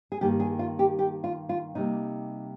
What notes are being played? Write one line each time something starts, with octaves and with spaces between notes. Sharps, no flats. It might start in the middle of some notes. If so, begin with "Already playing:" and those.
G#4
G2 D#3 A#3 G4
G#4
F4
G4
G4
F4
F4
C3 G3 A#3 D#4